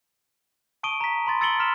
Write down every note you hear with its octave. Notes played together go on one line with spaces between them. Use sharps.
A5 C#6 D#6 D7 D#7 G7
A#5 B6
A5 B5 C6 A6
E6 A6 C#7 D7 F#7 G7
C6 F6 B6 E7 F7